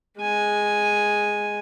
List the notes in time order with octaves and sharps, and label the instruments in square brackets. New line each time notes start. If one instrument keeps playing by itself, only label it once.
[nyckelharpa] G#3 G#5